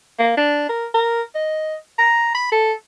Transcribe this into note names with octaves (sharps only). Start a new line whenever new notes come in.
A#3
D4
A#4
A#4
D#5
A#5
B5
A4